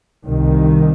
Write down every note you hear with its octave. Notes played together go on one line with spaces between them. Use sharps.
C2 C3 D#3